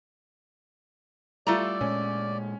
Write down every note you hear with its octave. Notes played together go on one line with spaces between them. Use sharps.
G3 A3 E4 F4 A4 D5 A#5
A#2 G#3 C#4